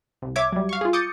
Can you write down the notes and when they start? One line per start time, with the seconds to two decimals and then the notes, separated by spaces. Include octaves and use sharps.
0.22 C2
0.36 C#5 E5 D6 G#6
0.52 F#3 G3
0.69 F5 C#6
0.81 F4 G#4
0.93 D6 D#6 G6 A6 C#7